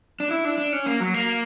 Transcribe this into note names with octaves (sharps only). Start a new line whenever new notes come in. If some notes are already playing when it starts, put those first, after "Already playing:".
D4
E4
D4
D4
C#4
A#3
F#3
A#3